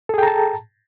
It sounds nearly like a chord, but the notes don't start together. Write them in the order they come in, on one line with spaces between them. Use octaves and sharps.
A4 G#4 G5 A#5 A5